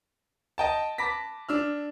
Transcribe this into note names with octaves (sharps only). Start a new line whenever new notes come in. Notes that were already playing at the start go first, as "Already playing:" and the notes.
D#5 G5 A5
A5 B5 D6 A#6 B6
D4 E6 F6